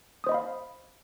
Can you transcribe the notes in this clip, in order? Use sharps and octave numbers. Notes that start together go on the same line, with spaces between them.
C5 D#5 F5 B5 D#6